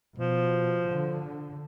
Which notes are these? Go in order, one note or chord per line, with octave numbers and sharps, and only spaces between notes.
B2 F3
D3